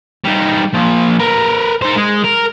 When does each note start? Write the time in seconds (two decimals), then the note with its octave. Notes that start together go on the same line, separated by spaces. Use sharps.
0.25 G3 D#4
0.74 A#2 F3
1.20 A#4 B4
1.82 D#4 C5
1.96 G#3
2.24 A#4